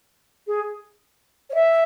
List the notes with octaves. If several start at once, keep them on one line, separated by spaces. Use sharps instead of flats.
G#4
C#5
E5